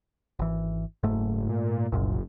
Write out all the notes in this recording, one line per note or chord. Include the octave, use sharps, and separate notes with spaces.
G#1 E3
F#1 G#2 A3
A#2
F#1 C2 F#2 A#2